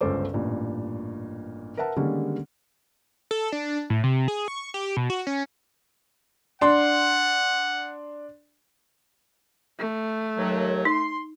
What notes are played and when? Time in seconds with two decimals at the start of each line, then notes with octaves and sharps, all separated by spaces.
0.01 G1 C#2 C#4 A4 C5 D6
0.34 A1 G2 A#2
1.77 A#4 B4 E5 F#5 A5
1.96 D3 D#3 G3 G#3 A#3 C#4
3.31 A4
3.52 D4
3.90 A2
4.04 C3
4.28 G#4
4.48 C#6
4.74 G4
4.97 B2
5.10 F#4
5.27 C#4
6.61 D4 F#5 C6
9.79 A3
10.38 D#2 F#3
10.85 D#4 C6